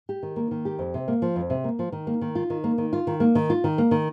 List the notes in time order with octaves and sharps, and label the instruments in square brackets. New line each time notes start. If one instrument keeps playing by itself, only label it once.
[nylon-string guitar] G4
D#3
A#3
D#3
G4
F2
C3
A#3
F3
F2
C3
A#3
F3
D#3
A#3
D#3
F4
D#3
A#3
D#3
F4
D#3
A#3
D#3
F4
D#3
A#3
D#3